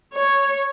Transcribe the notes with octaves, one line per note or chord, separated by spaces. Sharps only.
C#5